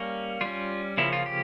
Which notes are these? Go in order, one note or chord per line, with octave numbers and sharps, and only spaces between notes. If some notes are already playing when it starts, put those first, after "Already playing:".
Already playing: G3 A#3 C#4
G3 C#4 F4
C#3 F3 A#3 C#4 E4
F4
G4